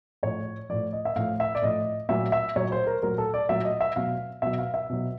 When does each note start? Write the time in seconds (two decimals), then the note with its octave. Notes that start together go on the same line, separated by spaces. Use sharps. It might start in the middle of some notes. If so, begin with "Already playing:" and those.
0.23 A2 F3 C#5
0.69 A2 F3 D5
0.93 D#5
1.05 E5
1.16 A2 F3 F5
1.40 E5
1.55 D5
1.62 A2 F3 D#5
2.09 A#2 F#3 E5
2.32 E5
2.56 A#2 F#3 C#5
2.72 C5
2.87 A#4
3.03 A#2 F#3 A#4
3.18 A4
3.34 D5
3.49 A#2 F#3 E5
3.65 D#5
3.81 E5
3.96 B2 F#3 F5
4.42 B2 F#3 E5
4.58 F5
4.74 E5
4.90 B2 F#3